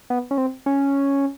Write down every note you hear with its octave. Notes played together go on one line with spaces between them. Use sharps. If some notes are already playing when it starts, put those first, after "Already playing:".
B3
C#4
C4
C#4